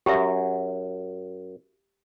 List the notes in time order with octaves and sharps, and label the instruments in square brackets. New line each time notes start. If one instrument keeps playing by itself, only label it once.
[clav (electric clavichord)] F#2 [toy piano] G4 E5